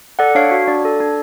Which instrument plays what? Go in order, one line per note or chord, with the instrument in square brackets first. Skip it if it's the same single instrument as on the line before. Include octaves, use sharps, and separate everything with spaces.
[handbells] A4 D5 F#5
D4 C#5 F5
F#4
D4 D5
A4
D4